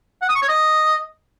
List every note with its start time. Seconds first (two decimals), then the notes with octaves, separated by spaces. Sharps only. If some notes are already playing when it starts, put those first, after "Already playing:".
0.22 F#5
0.29 D#6
0.35 C#6
0.42 C#5
0.48 D#5